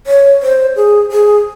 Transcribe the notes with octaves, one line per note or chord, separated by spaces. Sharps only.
C#5
C5
G#4
G#4